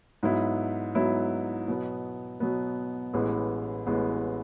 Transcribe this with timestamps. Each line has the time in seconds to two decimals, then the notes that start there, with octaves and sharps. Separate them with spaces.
0.23 G#2 F#3 B3 E4
0.95 G#2 F#3 B3 E4
1.68 B2 F#3 B3
2.40 B2 F#3 B3
3.14 A1 A2 G#3 B3
3.86 A1 A2 G#3 B3